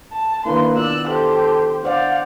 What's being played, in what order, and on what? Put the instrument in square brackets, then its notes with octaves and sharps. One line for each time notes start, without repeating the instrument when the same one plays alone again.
[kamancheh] A5
[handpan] D#3 D4 E4 [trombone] A#3 [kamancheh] B4 C6
[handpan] B3 F4 D5 [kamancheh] E6 F#6
[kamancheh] G4 C5 [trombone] A4
[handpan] D4 C5 D5 [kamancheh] F5 F#5